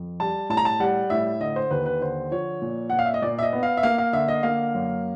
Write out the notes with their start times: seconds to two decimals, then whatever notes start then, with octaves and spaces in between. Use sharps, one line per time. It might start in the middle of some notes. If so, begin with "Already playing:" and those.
Already playing: F2
0.20 G3 A5
0.50 A2 A5
0.57 A#5
0.65 A5
0.80 G3 F#5
1.10 A2 E5
1.40 D3 D#5
1.56 C5
1.71 D#2 B4
1.86 B4
2.01 D3 C5
2.31 F3 C#5
2.62 A#2
2.90 A#2 F#5
2.99 F5
3.06 E5
3.14 D#5
3.22 A#2 D5
3.39 E5
3.43 D#5
3.53 B3
3.63 F5
3.77 E5
3.83 A#3 F5
3.98 F5
4.13 D3 E5
4.28 D#5
4.43 A#3 F5
4.74 F#2